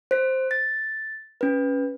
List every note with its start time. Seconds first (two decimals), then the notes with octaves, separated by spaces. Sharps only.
0.11 C5 B6
0.51 A6
1.41 C#4 B4